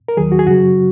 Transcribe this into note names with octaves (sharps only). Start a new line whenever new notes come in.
A#4
D#2 D#3 F#3 G#4
F#4
G#4
F#2 C#3 F#3 F#4